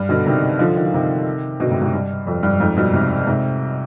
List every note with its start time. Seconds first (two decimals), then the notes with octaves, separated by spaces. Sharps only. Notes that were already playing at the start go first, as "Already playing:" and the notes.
Already playing: G2
0.09 B2 D3
0.26 C3 D#3
0.59 D3 F3
0.76 D#3
0.85 F3
0.94 C3 D#3
1.60 B2 D3
1.70 G#2 C3
1.81 G#2 C3
1.93 G2
2.27 F2
2.43 G2
2.60 F2 G#2
2.76 G2 B2
2.93 G#2 C3
3.27 G#2 C3